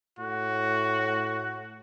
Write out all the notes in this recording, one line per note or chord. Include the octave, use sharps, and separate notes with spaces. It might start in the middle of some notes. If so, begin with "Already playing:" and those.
A2 F#4